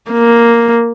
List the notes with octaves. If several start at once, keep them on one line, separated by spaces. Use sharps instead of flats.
A#3